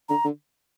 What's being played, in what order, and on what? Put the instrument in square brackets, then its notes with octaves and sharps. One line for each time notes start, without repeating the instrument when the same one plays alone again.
[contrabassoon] D3 [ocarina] A#5
[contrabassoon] D3